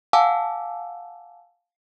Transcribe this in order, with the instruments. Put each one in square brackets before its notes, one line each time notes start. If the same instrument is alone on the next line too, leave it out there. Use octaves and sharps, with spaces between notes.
[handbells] F5 F#5 G#5 A5 D6 E6